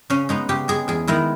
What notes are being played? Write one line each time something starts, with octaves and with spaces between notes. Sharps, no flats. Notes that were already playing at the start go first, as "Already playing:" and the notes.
C#3 C#4
G#3 B3 D#4
C#3 G4
G#3 B3 G#4
E2 G#4
D#3 G#3 B3 E4